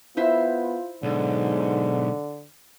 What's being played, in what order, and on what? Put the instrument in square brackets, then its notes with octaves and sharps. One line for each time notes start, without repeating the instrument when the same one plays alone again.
[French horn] B3 [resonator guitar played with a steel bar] E4 C5 E5 [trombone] F4
[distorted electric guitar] B1 [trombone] G#2 [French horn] D3